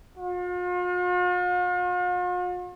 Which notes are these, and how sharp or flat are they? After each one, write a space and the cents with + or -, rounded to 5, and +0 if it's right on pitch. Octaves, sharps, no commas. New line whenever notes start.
F4 +45